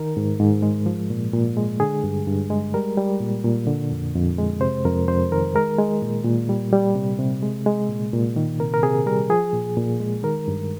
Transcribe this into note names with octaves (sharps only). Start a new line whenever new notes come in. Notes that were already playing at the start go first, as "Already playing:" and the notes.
Already playing: D#3 A#4
G#2
G#2
G#3
F3
A#2
A#2
G#3
D3 G#4
G2
G2
G#3
G3 A#4
G3
A#2
A#2
D3
F2
F2
G#3
C3 C5
F2 A#4
F2 C5
D#3 A#4
G#3 A#4
G#3
A#2
A#2
G3
G3
C3
C3
G#3
G#3
A#2
A#2
D#3
C3 A#4
A#4
C3 G#4
G3 A#4
F3 G#4
A#2
A#2
G#3
D#3 A#4
G2